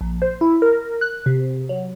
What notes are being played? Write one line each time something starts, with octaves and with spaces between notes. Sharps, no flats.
A#1
C5
E4
A#4
F#6
C3
F#3